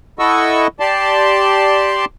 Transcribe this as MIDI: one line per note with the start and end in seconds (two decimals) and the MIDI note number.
0.19 0.67 64
0.19 0.67 69
0.19 0.67 75
0.19 0.67 78
0.19 0.67 85
0.19 0.67 88
0.80 2.05 67
0.80 2.05 74
0.80 2.05 81
0.80 2.05 84